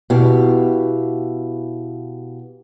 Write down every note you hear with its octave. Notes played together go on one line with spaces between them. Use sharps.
B2 E4 G4 F5